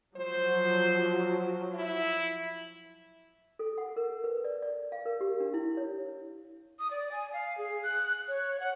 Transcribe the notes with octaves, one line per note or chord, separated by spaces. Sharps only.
F3 F#3 C5
E4
A4
F#5
A#4
B4
D5
D5
F5
A#4
G4
D4
E4
C#5
D#6
D5
G#5
F5
G#4
F#6
C#5
F#5